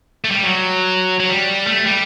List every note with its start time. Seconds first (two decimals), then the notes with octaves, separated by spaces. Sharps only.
0.25 A3
0.31 G3
0.43 F#3
1.20 F#3
1.30 G3
1.67 A3
1.86 G3